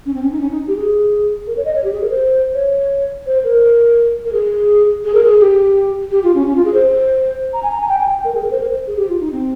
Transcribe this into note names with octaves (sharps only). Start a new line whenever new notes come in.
C#4
C4
C#4
D#4
C#4
D#4
G4
G#4
A#4
C#5
D#5
C#5
G4
G#4
A#4
C5
C#5
C5
A#4
A#4
G#4
G#4
A#4
G#4
G4
G4
F4
C#4
C#4
F4
G#4
C5
A#5
G#5
A#5
G#5
G5
G#5
G5
A#4
G#4
A#4
C5
A#4
C5
G#4
G4
F4
D#4
C4